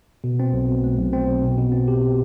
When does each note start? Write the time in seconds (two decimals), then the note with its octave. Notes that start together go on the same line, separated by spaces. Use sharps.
0.24 B2
0.40 C4
0.53 B1
0.68 B2
0.84 A3
0.98 B1
1.13 C4
1.28 B1
1.43 B2
1.57 B2
1.72 C4
1.88 G4
2.02 B2